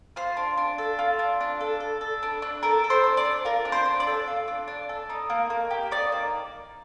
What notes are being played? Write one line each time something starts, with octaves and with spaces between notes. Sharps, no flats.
F4 C5
D4
D4
A4
F4
D4
D4
A4
A4
A4
D4
D4
A4 A#4
A4
C5
D4
D5
D4
F4 A#4
D4
C5
D4
D5
A4
F4
D4
D4
A4
D#4
A#3
A#3
G4
D#4 D5
A#3